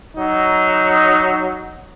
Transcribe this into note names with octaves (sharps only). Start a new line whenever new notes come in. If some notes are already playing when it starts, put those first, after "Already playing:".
F#3 D#4